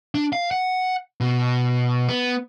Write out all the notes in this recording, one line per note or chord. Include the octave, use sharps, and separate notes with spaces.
D4
F5
F#5
B2
B3